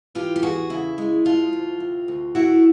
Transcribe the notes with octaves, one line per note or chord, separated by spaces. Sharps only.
E3 F4 G4
G4
E2 F#4 G#4
C#3 E4
G#3
F3 F4
D2
C3
D2
A3 E4 F#4